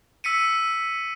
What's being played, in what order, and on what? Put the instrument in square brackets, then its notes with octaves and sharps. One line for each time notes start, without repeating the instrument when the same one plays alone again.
[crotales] E6 B6 C#7 D#7